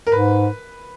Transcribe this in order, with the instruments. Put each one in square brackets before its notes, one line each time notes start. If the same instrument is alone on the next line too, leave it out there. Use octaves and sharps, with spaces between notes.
[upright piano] A#4
[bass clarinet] G#2 [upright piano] B4